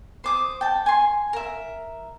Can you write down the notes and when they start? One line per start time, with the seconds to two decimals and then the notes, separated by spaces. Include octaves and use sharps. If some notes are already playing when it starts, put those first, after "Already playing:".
0.24 C5 D6 D#6
0.61 G5 A5
0.86 G#5 C6
1.33 A#4 E5